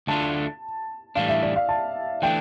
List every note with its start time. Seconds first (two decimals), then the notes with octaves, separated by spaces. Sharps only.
0.07 D2 D3 A3 D4 F4 A5
1.15 A2 E3 G3 D4 F5
1.29 E5
1.43 D5
1.56 F5
1.69 A5
2.22 E3 A3 D4 G5